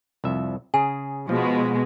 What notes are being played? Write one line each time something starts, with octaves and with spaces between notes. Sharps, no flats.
C2 F2 E5
C#3 G#4 G#5
B2 F3 G#3